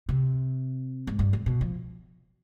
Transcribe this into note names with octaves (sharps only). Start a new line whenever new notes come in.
C3
G#2
G2
G#2
B2
F3